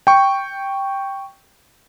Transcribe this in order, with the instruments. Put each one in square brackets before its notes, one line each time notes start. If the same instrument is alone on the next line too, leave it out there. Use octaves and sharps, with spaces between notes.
[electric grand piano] G5 C#6